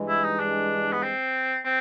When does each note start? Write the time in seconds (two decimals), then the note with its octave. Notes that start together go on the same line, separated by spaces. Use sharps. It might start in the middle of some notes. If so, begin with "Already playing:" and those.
Already playing: G2 E3 G#3
0.09 E4
0.24 D#4
0.40 D4
0.92 B3
1.03 C4
1.65 C4